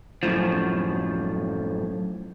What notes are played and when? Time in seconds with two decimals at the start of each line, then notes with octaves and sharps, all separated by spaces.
0.23 F#2 A2 F3